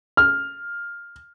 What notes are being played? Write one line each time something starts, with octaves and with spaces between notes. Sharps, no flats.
F6